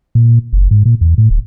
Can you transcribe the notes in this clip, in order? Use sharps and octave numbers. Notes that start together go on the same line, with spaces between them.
A#2
F#1
G#2
A#2
E2
A2
D1